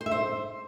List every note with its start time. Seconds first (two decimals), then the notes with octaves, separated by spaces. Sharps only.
0.01 C5
0.06 E5
0.11 C5